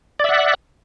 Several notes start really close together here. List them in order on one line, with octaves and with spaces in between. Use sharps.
D5 E5 F#5